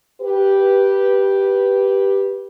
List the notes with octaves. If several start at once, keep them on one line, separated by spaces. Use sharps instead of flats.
G4 B4